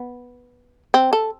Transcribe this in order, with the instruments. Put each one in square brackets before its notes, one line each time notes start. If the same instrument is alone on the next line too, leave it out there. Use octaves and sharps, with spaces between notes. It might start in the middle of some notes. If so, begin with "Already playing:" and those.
Already playing: [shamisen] B3
C4
A4